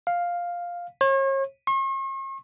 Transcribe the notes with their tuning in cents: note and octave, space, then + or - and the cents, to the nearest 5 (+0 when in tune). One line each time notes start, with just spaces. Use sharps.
F5 +5
C#5 -40
C#6 -45